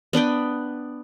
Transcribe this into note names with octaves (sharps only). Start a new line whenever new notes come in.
B3 D4 B4 G5